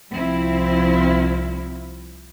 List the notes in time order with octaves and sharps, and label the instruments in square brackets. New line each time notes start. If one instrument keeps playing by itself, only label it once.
[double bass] C2 F3 [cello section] C4 E4